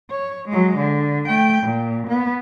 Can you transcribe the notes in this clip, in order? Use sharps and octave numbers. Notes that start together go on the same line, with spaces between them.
C#5
F#3 G#3
D3
A3 G5
A#2
B3